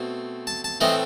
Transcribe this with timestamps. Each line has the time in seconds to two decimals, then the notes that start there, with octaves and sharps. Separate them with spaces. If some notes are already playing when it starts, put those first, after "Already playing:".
Already playing: B2 A3 C4
0.47 A5
0.64 A5
0.81 A2 E3 A3 C4 D#5